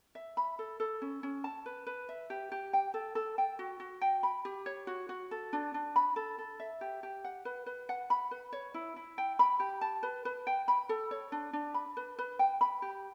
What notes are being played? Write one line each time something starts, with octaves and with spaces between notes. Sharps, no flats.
E5
B5
A4
A4
C#4
C#4
A5
B4
B4
E5
G4
G4
G5
A4
A4
G5
F#4
F#4
G5
B5
G4
C#5
F#4
F#4
A4
D4
D4
B5
A4
A4
E5
G4
G4
F#5
B4
B4
F#5
B5
B4
C#5
E4
E4
G5
B5
G4
A5
B4
B4
G5
B5
A4
C#5
D4
D4
B5
B4
B4
G5
B5
G4